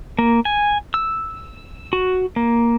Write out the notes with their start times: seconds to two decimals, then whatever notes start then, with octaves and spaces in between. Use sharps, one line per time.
0.19 A#3
0.45 G#5
0.94 E6
1.93 F#4
2.36 A#3